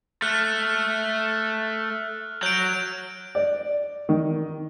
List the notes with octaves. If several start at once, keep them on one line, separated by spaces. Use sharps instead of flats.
A3 F6 F#6
F#3 G6 D7
D5
D#3